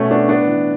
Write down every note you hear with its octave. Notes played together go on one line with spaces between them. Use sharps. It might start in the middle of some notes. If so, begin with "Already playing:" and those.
Already playing: B2 A3 C#4
B3 D4
A2 B3 D4
E3